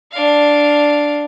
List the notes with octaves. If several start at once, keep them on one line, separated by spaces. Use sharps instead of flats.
D4 F5